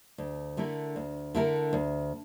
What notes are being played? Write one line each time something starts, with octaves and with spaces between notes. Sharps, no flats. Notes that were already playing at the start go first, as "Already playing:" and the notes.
D2
D3 A3 E4 A#4
D2
D3 A3 E4 A#4
D2